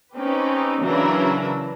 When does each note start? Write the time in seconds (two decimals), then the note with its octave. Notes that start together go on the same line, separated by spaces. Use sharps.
0.16 C4 C#4 D#4 G4 B4
0.82 C#3 E3 F#3 D4 E4 A#4